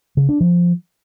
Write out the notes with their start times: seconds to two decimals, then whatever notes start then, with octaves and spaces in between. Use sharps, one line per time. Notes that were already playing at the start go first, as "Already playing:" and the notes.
0.17 C#3
0.29 D4
0.41 F3